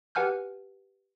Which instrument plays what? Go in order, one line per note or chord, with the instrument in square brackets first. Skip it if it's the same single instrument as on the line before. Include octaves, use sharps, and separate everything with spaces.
[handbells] G4 B4 F#5 G#5 F6 G6